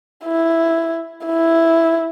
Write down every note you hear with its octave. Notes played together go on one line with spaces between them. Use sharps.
E4
E4